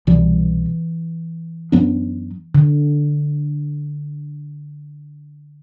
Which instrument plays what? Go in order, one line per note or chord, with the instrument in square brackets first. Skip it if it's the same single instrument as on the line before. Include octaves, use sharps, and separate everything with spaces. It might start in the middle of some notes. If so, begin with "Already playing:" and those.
[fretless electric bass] C2 B2 G3 [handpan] E3
[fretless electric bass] F#2 F#3 B3 D4
[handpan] D3